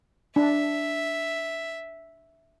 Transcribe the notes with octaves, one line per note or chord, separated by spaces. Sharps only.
D4 E5